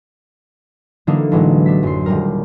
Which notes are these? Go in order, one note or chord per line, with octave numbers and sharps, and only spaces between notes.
D3 E3 F#3 A#3 D4 D#4
A1 E3 F#3 G#3
D4 B6
F#2 C6
D#1 G3 A#4